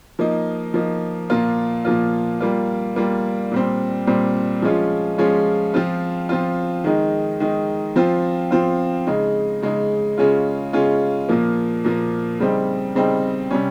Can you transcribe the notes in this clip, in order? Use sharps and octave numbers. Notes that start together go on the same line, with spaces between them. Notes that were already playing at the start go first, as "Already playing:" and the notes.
F3 A#3 D#4
F3 A#3 D#4
A#2 F3 A#3 F4
A#2 F3 A#3 F4
G3 A#3 F4
G3 A#3 F4
A#2 G3 C4
A#2 G3 C4
F3 G#3 C#4 F4
F3 G#3 C#4 F4
F3 C4 F4
F3 C4 F4
D#3 G#3 D#4
D#3 G#3 D#4
F3 C4 F4
F3 C4 F4
C#3 G#3 D#4
C#3 G#3 D#4
C#3 G#3 C#4 F4
C#3 G#3 C#4 F4
A#2 F3 A#3
A#2 F3 A#3
C#3 G3 C4 D#4
C#3 G3 C4 D#4
C3 G3 C#4